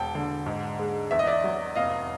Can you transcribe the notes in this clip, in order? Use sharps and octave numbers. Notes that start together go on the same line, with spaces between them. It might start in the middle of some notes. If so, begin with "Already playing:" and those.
Already playing: E1 G5 A5
D3
G#2
G#3
E2 E5
D#5
D5 E5
F#3
F1 D#5 F5